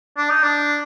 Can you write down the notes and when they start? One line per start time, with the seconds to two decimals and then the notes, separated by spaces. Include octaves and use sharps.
0.17 D4
0.30 D#4
0.43 D4